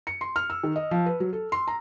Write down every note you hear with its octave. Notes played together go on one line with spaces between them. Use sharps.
C#7
C6
F6
E6
D#3
D#5
F3
B4
F#3
A4
C6
A#5